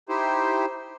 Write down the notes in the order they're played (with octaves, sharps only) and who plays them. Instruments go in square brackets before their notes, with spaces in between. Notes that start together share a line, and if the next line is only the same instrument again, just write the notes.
[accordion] D#4 E4 G4 C5